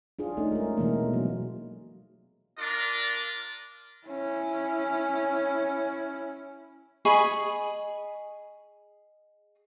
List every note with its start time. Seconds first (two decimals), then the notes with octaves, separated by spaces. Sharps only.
0.19 D4 F4 G#4
0.37 A3 C#4 D#4
0.52 G#3 A#4
0.77 B2 E3 G#3 A#3
1.14 F#3
2.59 D4 F4 A#4 D5
4.07 C#4 E4
7.05 G#4 D#5 B5 C#6